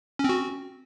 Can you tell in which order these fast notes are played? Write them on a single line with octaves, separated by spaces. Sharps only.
C#4 C4 F#4